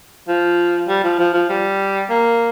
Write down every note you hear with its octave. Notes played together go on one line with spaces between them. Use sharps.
F3
G3
F3
F3
F3
G3
A#3